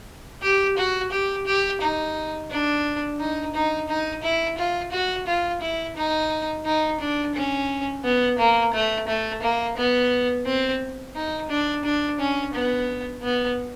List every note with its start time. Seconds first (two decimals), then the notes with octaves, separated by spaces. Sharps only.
0.43 G4
0.77 F#4
1.12 G4
1.46 G4
1.81 D#4
2.50 D4
3.20 D#4
3.54 D#4
3.89 D#4
4.23 E4
4.58 F4
4.92 F#4
5.27 F4
5.62 E4
5.96 D#4
6.65 D#4
7.00 D4
7.35 C#4
8.04 B3
8.38 A#3
8.73 A3
9.08 A3
9.42 A#3
9.77 B3
10.46 C4
11.15 D#4
11.50 D4
11.85 D4
12.19 C#4
12.54 B3
13.23 B3